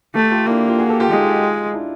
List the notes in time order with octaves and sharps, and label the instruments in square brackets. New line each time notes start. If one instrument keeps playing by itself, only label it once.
[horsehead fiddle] A3 [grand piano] G4 A4
[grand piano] F4 G4
[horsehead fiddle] A#3 [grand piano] D4 E4
[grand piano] F4 G4
F#4 G#4
G4 A4
F4 G4
[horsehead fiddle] G#3 [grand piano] D#4 F4
[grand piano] D4 E4